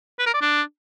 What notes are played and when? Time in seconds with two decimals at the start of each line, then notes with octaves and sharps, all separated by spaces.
0.19 B4
0.26 A#4
0.34 D5
0.41 D4